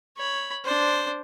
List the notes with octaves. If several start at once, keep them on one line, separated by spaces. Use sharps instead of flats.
C#5 B5
D4 C5